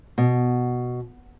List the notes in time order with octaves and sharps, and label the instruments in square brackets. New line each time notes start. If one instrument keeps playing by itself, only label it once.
[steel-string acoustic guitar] B2